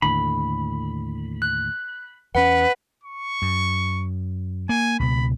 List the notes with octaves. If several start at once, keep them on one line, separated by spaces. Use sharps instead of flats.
D#2 A2 D3 B5
F#6
E2 C#4 B4 F#5
C#6
F#2
A#3 G#5
C#2 B2 B5